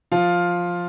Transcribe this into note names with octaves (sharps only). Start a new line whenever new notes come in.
F3 F4